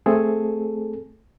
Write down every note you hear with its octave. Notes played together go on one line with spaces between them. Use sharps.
A3 C4 G#4 A4